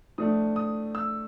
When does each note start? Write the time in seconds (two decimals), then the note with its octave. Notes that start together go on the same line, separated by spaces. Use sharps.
0.18 A2 F3 A3 D4 D#6
0.56 D#6
0.95 E6